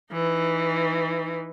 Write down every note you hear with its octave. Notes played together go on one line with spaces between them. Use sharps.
E3 D#4